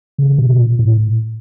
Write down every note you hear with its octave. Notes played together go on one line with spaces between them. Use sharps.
C#3
B2
A#2
A2